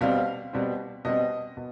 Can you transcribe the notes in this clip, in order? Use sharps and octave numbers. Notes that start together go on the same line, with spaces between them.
B2 G3 C4 F5
B2 G3 C4
B2 G3 C4 D#5
B2